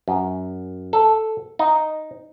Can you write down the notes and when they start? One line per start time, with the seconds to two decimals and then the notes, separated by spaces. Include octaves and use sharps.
0.08 F#2
0.93 A4
1.59 D#4